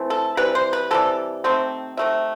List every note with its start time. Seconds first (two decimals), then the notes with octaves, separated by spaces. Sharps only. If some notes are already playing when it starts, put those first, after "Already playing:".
Already playing: E3 A3 C4
0.10 A4
0.37 C3 E3 G3 B4
0.55 C5
0.73 B4
0.91 C3 E3 G3 A4
1.44 C3 D#3 A3 C4
1.97 C3 D#3 A3 E5